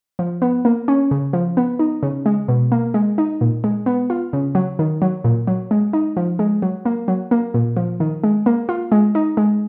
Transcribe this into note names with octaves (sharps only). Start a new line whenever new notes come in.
F3
B3
A#3
C#4
C#3
F3
B3
D#4
C#3
G#3
B2
A#3
G#3
D#4
A#2
G#3
B3
F4
C#3
F#3
D#3
F#3
A#2
F#3
G#3
D#4
F3
G#3
F#3
A#3
F#3
A#3
A#2
F3
D#3
G#3
A#3
F4
G#3
D#4
G#3